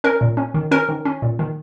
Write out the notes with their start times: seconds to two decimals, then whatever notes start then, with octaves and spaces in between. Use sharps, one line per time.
0.04 C#4 A#4
0.21 A#2
0.37 C#4
0.54 D#3
0.71 C#4 A#4
0.89 D#3
1.05 C#4
1.22 A#2
1.39 D#3